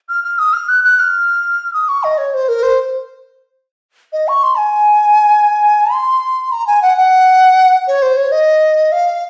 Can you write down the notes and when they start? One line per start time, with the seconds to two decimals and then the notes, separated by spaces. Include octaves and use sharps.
0.09 F6
0.24 F6
0.38 D#6
0.53 F6
0.68 F#6
0.84 F#6
0.99 F6
1.73 D#6
1.88 C#6
2.03 D#5
2.18 C#5
2.34 C5
2.48 A#4
2.63 C5
4.13 D#5
4.28 C#6
4.43 C6
4.57 G#5
5.93 C6
6.52 A#5
6.67 G#5
6.82 F#5
6.97 F#5
7.87 C#5
8.02 C5
8.16 C#5
8.31 D#5
8.92 F5